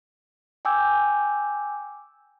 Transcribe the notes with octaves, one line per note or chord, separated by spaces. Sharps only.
G5 G#5 D6 E6 G6